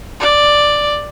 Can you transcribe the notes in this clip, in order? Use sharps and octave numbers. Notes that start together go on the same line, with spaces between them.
D5